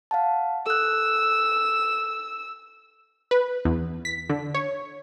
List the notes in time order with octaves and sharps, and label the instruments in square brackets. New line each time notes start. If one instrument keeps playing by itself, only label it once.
[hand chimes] F5 F#5 A5
[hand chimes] A4 D#6 F#6 [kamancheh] E6
[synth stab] B4
E2
B6
D3
C#5